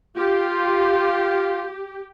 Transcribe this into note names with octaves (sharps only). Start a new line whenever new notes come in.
F4 G4